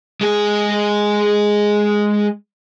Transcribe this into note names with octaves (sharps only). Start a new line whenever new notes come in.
G#3 G#4